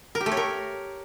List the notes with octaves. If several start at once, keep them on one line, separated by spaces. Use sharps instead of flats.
A#4
G4
A3
C#5
A#4